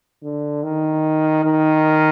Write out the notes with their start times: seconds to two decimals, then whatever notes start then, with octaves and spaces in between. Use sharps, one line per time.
0.23 D3
0.63 D#3
1.45 D#3